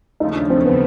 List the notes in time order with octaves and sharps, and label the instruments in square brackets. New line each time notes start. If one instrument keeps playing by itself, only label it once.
[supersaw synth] D#2 C#3 F3 A3 [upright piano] D#4
[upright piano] D4
C4
B3